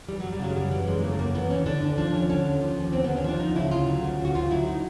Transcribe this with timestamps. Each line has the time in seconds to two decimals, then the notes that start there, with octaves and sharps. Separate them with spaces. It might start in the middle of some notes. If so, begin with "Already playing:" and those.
0.08 E3 G3
0.20 F#3
0.24 F#2
0.32 G3
0.40 C#3 F#3
0.50 G#3
0.56 F#2 G3
0.71 E3 G3
0.87 F#2 G#3
1.02 C#3 A#3
1.12 A3
1.19 F#2 A#3
1.35 E3 B3
1.50 D#2 C#4
1.66 D3 D4
1.82 D#2 D4
1.98 F3 D4
2.14 D#2 C#4
2.29 D3 C#4
2.45 D#2
2.61 F3
2.77 D#2
2.93 D3 C4
3.04 B3
3.09 D#2
3.16 C#4
3.24 F3 D4
3.40 D2 D#4
3.56 C#3 E4
3.71 D2 F4
3.88 F#3
4.03 D2
4.19 C#3
4.25 F#4
4.35 D2 F4
4.51 F#3 E4
4.67 D#4